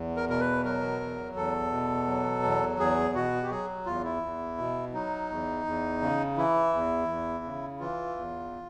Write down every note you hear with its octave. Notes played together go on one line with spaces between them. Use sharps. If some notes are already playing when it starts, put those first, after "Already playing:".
Already playing: E2
A#4
B2 A#4
B4
F#3 A#4
E2
E2 A4
B2
F#3
E2
E2 G#4
B2 F#4
G4
F#3 G#4
E2 F4
E4
E2
B2
F#3 D#4
E2
E2
C#3
E3 E4
E2
E2
C#3
E3 F4
E2